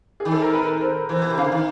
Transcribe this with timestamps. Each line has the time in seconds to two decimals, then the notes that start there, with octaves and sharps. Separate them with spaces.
0.20 G#4
0.25 D#3
0.32 A4
0.42 A#4
0.53 B4
0.81 C5
1.09 E3 C5
1.22 B2
1.30 C3
1.37 C#3 F5
1.44 D3
1.52 D#3